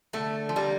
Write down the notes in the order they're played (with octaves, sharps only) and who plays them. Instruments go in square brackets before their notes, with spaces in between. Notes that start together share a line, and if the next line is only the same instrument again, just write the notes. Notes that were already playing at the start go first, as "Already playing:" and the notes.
[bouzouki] D3 [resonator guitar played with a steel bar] A3
[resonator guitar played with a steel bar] F3
[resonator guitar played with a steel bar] G3 [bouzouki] A#3